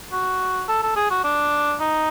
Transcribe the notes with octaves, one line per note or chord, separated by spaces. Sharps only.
F#4
A4
A4
G#4
F#4
D4
D#4